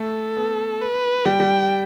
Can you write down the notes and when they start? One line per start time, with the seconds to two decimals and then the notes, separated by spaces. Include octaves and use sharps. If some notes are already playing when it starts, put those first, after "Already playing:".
Already playing: A3 A4
0.37 B3
0.82 B4
1.26 G3 G5
1.40 G3